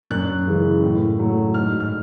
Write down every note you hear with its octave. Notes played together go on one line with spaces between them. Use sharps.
F#2 F#6
C#3 E3 G#3
A2
F#3 A3
G#2 F6
F6